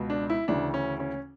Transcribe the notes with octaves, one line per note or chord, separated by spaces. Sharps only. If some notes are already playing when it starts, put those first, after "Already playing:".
Already playing: C#2 B2
D4
E4
D2 C#3 E3 D4
C#4
C#4